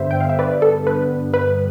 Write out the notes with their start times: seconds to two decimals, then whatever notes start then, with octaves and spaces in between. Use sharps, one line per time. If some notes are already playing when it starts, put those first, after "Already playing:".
Already playing: G2 D3 G3 B3 C5 E5
0.11 G5
0.20 F5
0.29 E5
0.39 B4 D5
0.62 A4
0.87 B4
1.34 B4